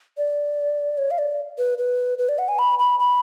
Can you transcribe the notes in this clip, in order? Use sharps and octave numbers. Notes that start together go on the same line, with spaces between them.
D5
C#5
F5
D5
B4
B4
B4
D5
F#5
G#5
B5
B5
B5